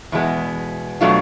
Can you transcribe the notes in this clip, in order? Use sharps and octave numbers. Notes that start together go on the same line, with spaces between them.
E2 B2 G#3 B3
B2 F#3 A3 D4 F4